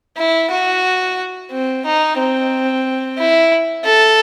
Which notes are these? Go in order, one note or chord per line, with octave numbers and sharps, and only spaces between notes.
E4
F#4
C4
D#4
C4
E4
A4